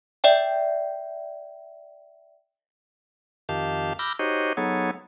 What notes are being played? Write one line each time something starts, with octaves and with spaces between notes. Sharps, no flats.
D5 E5 G5
F2 D#3 G4 F5 A5
B5 D6 E6 F6 G6 A#6
D#4 F#4 G4 C5 C#5 D#5
F#3 B3 D#4 G#4 A4 C#5